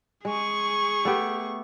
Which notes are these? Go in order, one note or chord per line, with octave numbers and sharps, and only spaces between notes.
G#3 G#4 C#6
A3 B3 G4